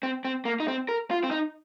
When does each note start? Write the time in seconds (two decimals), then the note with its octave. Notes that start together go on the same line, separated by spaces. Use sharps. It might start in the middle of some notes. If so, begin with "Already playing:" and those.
0.03 C4
0.25 C4
0.45 A#3
0.60 D#4
0.68 C4
0.89 A#4
1.11 F4
1.24 C4
1.31 D#4